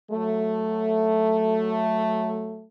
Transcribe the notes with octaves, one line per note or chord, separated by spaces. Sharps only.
F#3 A3